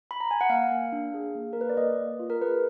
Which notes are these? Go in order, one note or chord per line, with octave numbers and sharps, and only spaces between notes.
B5
A#5
G#5
F#5
A#3 F5
A#3
D4
G#4
A#3
A#4
A#3 B4
D5
A#3 D#5
A#3
F4
A#4
G#4 B4